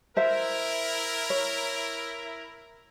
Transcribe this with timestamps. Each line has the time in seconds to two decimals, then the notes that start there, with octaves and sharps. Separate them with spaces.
0.17 E4 A#4 C5 E5
1.30 C#5